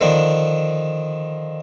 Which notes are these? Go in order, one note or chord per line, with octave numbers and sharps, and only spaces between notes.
D3 D#3 F3 D4